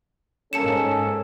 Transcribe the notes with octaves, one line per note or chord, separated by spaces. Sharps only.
G#2 A#3 C#4 A4 A5 C#7 E7